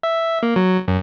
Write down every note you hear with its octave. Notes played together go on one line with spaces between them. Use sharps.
E5
A#3
F#3
F#2